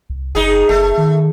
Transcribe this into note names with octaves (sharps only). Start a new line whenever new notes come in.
C2
F#1 D#4 G#4
F#1 A3
D#3